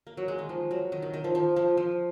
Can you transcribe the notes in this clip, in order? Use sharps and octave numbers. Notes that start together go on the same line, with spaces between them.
A#3
F#3
G#3
D#3
F3
F#3
D#3
D#3
D#3
F3
F3
F3
F3